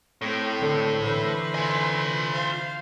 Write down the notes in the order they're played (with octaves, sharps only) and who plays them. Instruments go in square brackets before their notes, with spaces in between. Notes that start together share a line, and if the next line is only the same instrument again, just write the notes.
[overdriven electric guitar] A2 [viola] A3 C4
[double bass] D3
[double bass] D3 E3 [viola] B4 C5
[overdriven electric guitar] F4 G#5
[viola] C5 F5